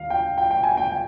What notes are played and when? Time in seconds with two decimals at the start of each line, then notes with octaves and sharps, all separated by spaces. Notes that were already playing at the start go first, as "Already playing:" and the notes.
Already playing: D#2 F5
0.10 G5
0.38 G5
0.51 G5
0.63 G#5
0.77 G5
0.91 G5